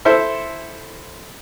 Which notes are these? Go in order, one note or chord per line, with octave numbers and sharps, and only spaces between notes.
E4 A4 C5 E5